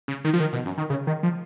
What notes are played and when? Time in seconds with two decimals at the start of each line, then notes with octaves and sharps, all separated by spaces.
0.08 C#3
0.25 D#3
0.33 F3
0.40 D#3
0.53 B2
0.66 F#2
0.78 D#3
0.90 C#3
1.07 D#3
1.23 F3